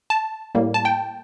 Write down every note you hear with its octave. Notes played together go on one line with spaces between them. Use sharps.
A5
A2 G3 A#3
A5
G5